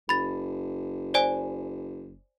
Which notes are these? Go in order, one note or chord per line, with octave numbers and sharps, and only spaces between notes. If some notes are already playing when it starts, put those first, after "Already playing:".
F#1 B5 A6
C5 D5 G#5